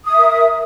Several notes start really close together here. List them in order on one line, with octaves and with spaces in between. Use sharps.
D#6 E5 A#4